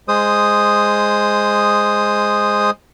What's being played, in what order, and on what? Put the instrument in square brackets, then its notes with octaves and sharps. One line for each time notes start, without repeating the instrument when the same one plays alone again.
[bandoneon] G#3 C5 D#6